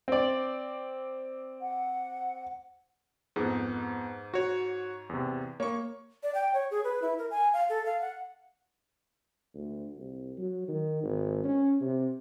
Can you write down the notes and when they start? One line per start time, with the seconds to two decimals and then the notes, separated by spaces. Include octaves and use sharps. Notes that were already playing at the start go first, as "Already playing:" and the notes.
0.08 C4 D5
1.61 F#5
3.36 F2 G#2 B3
4.34 F#4 C#5
5.09 E2 C3
5.60 A#3 C#5 C#6
6.23 D5
6.35 G5
6.54 C#5
6.71 G#4
6.84 B4
7.02 E4
7.18 A#4
7.31 G#5
7.53 F5
7.69 A4
7.86 F5
8.01 F#5
9.54 D2
9.98 C2
10.37 F#3
10.68 D#3
11.03 G#1
11.44 C#4
11.81 C3